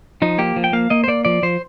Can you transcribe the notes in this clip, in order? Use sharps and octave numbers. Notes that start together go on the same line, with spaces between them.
F3 D#4
A#3 G4
F3
G5
A#3 F5
A#3 D#5
C5
A#3 D5
F3 D5
F3 C5